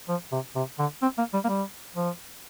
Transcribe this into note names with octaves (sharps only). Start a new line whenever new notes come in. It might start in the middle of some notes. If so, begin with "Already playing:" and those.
F3
C3
C3
D3
C4
A#3
G3
A#3
G3
F3